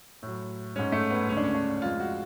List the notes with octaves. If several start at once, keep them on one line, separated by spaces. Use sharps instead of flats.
A2 F#3
G#2 G#3 C#4
A3
B3
D2 C#3 G#3 C#4
D4
C#4
D4
F2 F3 G#3 F4
F#4